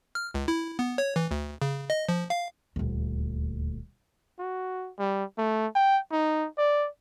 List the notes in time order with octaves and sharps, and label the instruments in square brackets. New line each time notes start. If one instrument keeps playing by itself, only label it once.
[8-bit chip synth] F6
C#2
E4
B3
C#5
E3
D2
C#3
D#5
F3
F5
[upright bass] D#1 D2
[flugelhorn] F#4
G3
A3
G5
D#4
D5